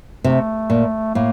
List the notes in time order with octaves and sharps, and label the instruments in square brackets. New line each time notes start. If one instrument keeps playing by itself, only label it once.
[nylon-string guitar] C3 [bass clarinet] A3
[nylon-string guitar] A#2
[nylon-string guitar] A2 [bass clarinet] A#3